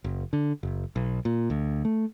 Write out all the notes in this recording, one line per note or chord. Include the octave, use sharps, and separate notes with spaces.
F#1
D3
F#1
B1
A#2
D2
A3